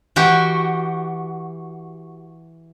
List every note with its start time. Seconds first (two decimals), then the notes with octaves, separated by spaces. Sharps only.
0.16 E3 F#4 G4